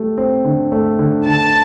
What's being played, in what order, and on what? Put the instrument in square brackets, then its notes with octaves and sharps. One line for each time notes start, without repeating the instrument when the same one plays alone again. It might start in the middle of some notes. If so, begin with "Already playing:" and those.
Already playing: [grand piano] A3 G4
C4
D3
A3
D3
[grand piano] D3 [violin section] A5